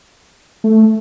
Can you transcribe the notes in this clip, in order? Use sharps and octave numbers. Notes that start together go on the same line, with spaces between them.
A3